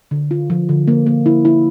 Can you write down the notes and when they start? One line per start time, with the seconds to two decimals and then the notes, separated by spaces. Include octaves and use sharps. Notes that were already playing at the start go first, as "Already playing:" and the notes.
0.11 D3
0.31 F4
0.50 F3
0.69 D3
0.88 A#3
1.06 A#3
1.26 E4
1.45 E4